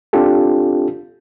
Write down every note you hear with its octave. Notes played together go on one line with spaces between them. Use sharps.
C4 D4 F4 G4 A4